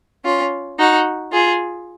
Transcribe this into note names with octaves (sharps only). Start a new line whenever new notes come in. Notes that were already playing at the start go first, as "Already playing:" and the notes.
C#4 F4
D#4 F#4
F4 G#4